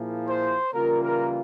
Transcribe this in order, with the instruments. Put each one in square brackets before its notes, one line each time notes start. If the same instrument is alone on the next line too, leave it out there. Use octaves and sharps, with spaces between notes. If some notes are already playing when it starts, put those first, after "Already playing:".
Already playing: [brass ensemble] A#2 F3 A#3 E4 G#4
[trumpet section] C5
[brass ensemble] C#3 E3 G3 A#3 F4 [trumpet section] A#4
[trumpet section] A#4